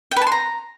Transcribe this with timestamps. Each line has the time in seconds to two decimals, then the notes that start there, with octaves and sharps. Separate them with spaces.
0.11 G5
0.16 B4
0.22 A5
0.27 C6
0.32 A#5